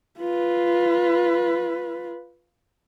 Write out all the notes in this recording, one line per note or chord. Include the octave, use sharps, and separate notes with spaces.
F4 B4